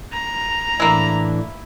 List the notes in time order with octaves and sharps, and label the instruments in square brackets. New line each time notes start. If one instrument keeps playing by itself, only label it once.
[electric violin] A#5
[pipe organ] A2 E3 D4 [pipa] A#3 E4